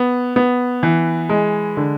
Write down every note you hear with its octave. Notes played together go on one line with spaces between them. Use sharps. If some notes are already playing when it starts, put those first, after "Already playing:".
Already playing: B3
B3
E3
G#3
D3